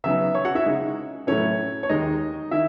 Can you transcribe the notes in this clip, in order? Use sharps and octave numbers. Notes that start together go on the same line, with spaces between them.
C#3 F#3 B3 D#4 E5 E6
C#5 C#6
F#4 F#5
E4 E5
C#3 G#3 D#4
A2 F#3 A3 C#4 E4 C#5
C#5
D#2 D#3 G#3 D#4 D#5
D#3 E4 E5